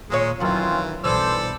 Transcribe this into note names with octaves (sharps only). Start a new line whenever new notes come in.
D#2 A#2 G#3 C#5
F#2 D#3 E3 F#3 C4 C#4 F4
B1 G2 E3 A4 C5 D5 E6